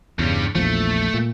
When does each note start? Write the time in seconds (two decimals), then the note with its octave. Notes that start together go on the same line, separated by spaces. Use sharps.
0.19 E2 G2 C#3 G3
0.55 A#1 E2 F3 A3
1.14 A#2